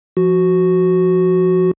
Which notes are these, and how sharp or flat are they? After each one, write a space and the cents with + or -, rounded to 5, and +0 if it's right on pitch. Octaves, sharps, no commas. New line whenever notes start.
F3 -10 F#4 +0